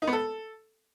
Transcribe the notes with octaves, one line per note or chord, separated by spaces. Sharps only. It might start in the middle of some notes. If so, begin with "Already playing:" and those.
D#4
B3
A4